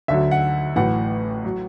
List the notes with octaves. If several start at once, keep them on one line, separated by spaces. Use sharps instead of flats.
D2 D3 F#3 E5
F#5
A1 A2 F#3 F#5
F#3